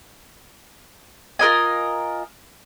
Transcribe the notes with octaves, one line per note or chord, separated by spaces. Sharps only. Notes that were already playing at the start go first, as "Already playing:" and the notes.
F4 A#4 D#5 G#5